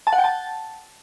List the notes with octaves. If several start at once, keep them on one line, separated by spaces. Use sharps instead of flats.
A5
F#5
G5
A5